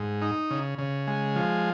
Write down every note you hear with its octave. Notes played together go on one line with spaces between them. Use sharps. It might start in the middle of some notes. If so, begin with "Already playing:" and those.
Already playing: G#2
D#4
C#3
C#3
G#3
F3